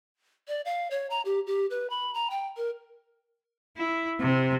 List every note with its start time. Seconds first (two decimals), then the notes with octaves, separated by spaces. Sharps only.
0.48 D5
0.65 F5
0.91 C#5
1.10 A#5
1.25 G4
1.47 G4
1.70 B4
1.90 B5
2.14 A#5
2.30 G5
2.57 A#4
3.77 E4
4.21 C3